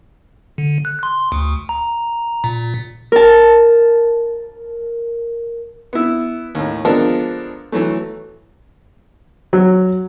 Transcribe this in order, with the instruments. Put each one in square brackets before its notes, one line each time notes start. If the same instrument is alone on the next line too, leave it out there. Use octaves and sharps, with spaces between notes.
[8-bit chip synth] D3
F#6
C6
D2
A#5
A#2
[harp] A#4 A5
[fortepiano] B3 E4
D#2 A2
F3 G#3 B3 D4 A4 A#4
E3 F#3 A3
F#3